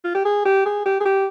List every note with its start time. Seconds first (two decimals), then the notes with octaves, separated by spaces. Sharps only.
0.04 F4
0.15 G4
0.25 G#4
0.45 G4
0.65 G#4
0.85 G4
1.00 G#4
1.05 G4